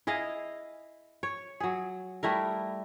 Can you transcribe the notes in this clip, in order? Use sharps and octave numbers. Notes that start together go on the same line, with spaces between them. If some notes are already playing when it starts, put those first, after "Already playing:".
E4 G#4 D#5 F5
C#5
F#3 G#4
G3 A3 E4 A#4